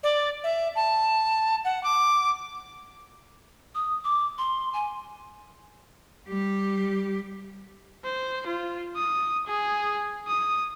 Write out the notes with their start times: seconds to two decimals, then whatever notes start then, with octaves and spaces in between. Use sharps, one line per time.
0.03 D5
0.44 E5
0.76 A5
1.65 F#5
1.84 D6
3.75 D#6
4.04 D6
4.38 C6
4.73 G#5
6.28 G3 G4
8.04 C5
8.47 F4
8.96 D#6
9.47 G#4
10.27 D#6